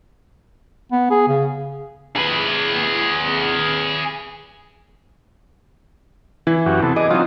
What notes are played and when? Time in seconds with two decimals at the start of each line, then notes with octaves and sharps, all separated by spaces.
0.92 B3
1.10 G#4
1.28 C#3
2.16 G#4 B4
6.47 E3 E4
6.66 F#2 F#4 G4
6.83 C3 B3 A4
6.96 G#4 D#5 D6
7.10 F#3 C4 D#4 F4 C5